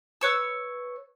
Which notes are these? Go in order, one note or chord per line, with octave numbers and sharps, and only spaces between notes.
B4 C#5 E6